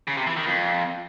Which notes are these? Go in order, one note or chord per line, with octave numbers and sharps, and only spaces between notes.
C#3
C3
E3
D#3
F2